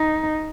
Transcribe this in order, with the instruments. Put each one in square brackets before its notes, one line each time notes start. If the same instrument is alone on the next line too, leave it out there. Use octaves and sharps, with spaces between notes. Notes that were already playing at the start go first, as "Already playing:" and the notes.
Already playing: [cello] D#4